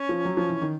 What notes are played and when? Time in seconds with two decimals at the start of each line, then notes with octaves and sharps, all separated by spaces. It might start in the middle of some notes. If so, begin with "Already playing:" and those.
Already playing: C#4
0.09 F3
0.25 F#3
0.37 F3
0.49 E3
0.62 D#3